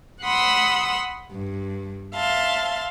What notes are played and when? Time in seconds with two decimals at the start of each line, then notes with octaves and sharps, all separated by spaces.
0.23 F#5 B5 C6 D#6 E6
1.31 G2
2.15 E5 F5 A5 C6